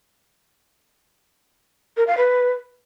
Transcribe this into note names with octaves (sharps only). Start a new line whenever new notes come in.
A#4
F5
B4